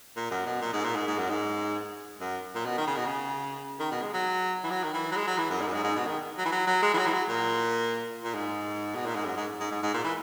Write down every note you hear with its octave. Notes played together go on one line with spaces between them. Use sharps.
A#2
F#2
B2
A#2
G#2
A#2
G#2
G#2
F#2
G#2
F#2
A#2
B2
D#3
C#3
B2
C#3
D#3
B2
G#3
F#3
E3
F#3
D#3
E3
F#3
G#3
F#3
E3
F#2
G#2
F#2
G#2
G#2
B2
D#3
F#3
E3
F#3
F#3
G#3
E3
F#3
E3
F#3
A#2
A#2
G#2
B2
A#2
G#2
F#2
G#2
G#2
G#2
G#2
A#2
E3